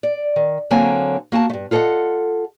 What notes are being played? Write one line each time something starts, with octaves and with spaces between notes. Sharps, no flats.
D5
D#3
D3 F#3 A#3 C4 C#5 G#5
A#3 F#4 G#5 A5
G2 A3
F4 G#4 A4 C5 D#5 F#5